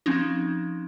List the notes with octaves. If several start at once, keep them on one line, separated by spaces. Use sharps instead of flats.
F3 C4 C#4 D#4